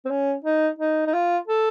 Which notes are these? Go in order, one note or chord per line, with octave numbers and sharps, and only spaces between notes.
C4
C#4
D#4
D#4
D#4
F4
A4